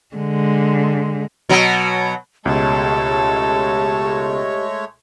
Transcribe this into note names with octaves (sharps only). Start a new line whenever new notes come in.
D3 G#3
B2 F#3
C#2 B2 G#3 A3 G4 A4 C#5